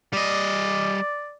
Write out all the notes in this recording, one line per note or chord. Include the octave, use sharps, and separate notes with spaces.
G3 D5 D#5